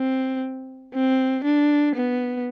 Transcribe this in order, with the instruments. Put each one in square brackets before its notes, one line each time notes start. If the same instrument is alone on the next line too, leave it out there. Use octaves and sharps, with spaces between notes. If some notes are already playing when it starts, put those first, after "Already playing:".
Already playing: [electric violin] C4
C4
D4
B3